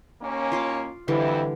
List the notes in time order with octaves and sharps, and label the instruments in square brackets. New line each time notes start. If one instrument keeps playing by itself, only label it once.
[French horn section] D#2 A#3 C#4
[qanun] F4 C6 D6
[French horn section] F2 E4 [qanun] D3 E3 G3